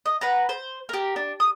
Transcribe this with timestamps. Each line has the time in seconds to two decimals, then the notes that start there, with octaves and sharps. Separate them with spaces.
0.06 D#5
0.21 B4 F#5 A#5
0.49 C5
0.89 G4 A#4
1.16 D4
1.40 D#6